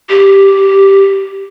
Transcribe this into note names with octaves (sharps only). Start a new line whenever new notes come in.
G4